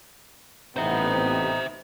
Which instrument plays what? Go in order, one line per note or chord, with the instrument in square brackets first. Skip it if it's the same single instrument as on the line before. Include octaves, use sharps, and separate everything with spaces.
[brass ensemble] A1 C3 B3 [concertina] D#4 [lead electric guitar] C5 E5